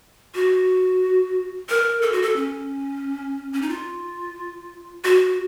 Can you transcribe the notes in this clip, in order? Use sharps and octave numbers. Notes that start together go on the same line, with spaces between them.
F#4
A#4
A4
F#4
A4
C#4
C#4
D#4
F4
F#4